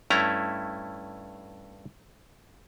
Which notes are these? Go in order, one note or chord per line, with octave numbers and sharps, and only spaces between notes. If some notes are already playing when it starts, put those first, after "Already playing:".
G2 A3 C#4 E4 A#5